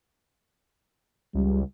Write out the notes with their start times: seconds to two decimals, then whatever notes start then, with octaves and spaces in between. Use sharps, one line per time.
1.35 C#2 G3